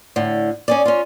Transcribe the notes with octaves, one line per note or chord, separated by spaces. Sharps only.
A2 D3
C#4 G#4 D5
C#4 F4